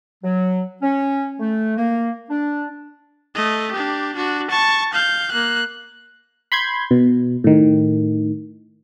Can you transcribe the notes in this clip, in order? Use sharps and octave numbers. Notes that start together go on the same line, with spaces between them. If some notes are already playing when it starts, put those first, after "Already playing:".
F#3
C#4
A3
A#3
D4
A3 D#5
D4 G4
D4 F#4
A5 C#6
F5 G6
A#3 F#6
B5 C6 G6 G#6
B2
A2 D#3